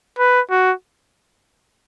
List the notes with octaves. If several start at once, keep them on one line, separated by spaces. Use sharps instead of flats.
B4
F#4